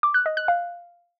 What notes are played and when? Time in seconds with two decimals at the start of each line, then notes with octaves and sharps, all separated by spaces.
0.03 D6
0.14 F#6
0.26 D#5
0.37 F#6
0.48 F5